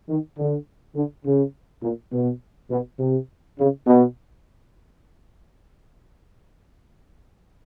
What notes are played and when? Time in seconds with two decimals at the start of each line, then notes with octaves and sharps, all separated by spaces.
0.09 D#3
0.38 D3
0.95 D3
1.26 C#3
1.83 A#2
2.12 B2
2.71 B2
3.00 C3
3.59 C#3
3.87 B2